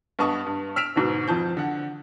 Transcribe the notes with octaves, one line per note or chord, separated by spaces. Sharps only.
G2 B3 D#5 A5 C#6 D#6
G2
E6 F6 B6 D7 E7 F7
D2 G#2 B2
F2 F3 A5 G6
D3 F#5